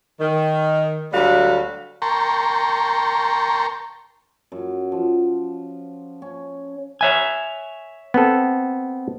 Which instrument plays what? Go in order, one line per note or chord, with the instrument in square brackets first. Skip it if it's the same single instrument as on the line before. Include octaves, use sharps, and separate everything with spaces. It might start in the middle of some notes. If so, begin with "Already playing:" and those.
[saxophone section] D#3
D2 F#3 G3 A3 F#4 F5
[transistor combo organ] A#4 G5 A5 A#5 C6 C#6
[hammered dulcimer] F#2
F3
C#4
[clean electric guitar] C#5 E5 G#5
[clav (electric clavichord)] B3 C4 A4